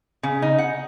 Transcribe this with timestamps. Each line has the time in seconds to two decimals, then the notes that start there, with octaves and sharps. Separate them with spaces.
0.23 C#3
0.42 D#4
0.58 F#5